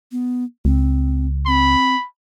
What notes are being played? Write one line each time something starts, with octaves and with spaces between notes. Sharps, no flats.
B3
C#2 C4
C4 B5